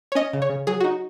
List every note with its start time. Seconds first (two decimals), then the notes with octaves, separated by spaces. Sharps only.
0.12 C#5
0.15 C#4 D#5
0.33 C#3
0.42 C#5
0.50 C#3
0.67 F#3 G#4
0.80 D#4 F#4